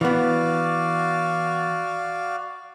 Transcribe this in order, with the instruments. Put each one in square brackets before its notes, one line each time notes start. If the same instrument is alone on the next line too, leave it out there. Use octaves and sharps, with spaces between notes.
[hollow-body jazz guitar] E3 B3 [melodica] F#4 D5 F5